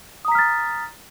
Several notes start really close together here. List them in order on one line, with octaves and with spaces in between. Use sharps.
D#6 A#5 B6 F6 A6